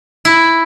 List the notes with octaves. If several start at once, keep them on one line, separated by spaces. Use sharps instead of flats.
E4